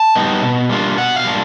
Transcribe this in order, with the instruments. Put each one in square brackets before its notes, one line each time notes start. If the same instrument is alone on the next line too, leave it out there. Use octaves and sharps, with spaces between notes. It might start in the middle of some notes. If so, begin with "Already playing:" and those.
Already playing: [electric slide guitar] A5
G3 B3 D#4
B2
G3 A#3 D4 F4
B2 F#5
F5
G3 A#3 D4 F4